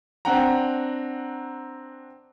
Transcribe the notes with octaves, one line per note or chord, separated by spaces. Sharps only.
C4 D4 F#5 G5 A#5